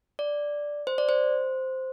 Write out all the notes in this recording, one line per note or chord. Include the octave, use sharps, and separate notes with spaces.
D5
C5
D5
C5